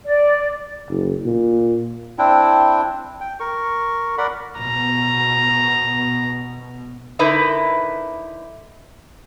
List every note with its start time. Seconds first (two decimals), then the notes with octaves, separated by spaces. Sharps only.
0.05 D5
0.89 F#1
1.25 A#2
2.18 C4 D4 E4 G5
3.21 G5
3.40 A#4 C#6
4.18 A#4 D5 F#5 B5
4.59 B2 A#5
7.19 D3 D#4 E4 A#4 B4